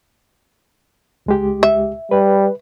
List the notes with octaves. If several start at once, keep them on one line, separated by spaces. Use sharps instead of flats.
C#2 G#3 G4
E5
G3 B4